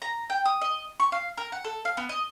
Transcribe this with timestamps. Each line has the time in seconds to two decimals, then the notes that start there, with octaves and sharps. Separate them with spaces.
0.02 A#5
0.30 G5
0.45 D#6
0.61 D#5
1.00 C#6
1.12 F5
1.37 A#4
1.52 F#5
1.65 A4
1.85 F5
1.97 B3
2.09 D#5